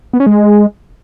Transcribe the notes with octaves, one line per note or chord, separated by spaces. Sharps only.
B3
C#4
G#3